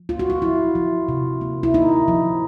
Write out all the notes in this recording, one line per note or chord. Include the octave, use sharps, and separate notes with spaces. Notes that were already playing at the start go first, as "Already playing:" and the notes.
Already playing: F3
A#3 F4
F#4
F4
F3 E4
F3
C3
A#3
E4
A#3 D#4
F3